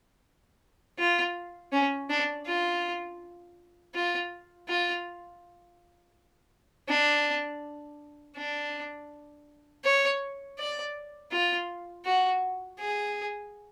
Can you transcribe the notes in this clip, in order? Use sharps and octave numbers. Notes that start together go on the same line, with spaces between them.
F4
C#4
D4
F4
F4
F4
D4
D4
C#5
D5
F4
F#4
G#4